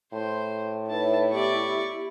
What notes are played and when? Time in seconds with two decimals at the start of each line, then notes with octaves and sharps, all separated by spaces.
0.13 A2 C5 C6
0.90 D#4 E4 B4 C#5 A5
1.32 B3 G4 D5 C#6